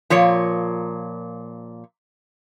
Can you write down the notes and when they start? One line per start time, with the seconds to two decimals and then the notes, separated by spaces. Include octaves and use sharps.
0.10 A#2 F3 A#3 C#5